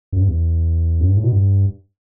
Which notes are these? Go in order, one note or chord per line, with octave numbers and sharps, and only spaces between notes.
F#2
G2
E2
F#2
G2
A2
B2
G2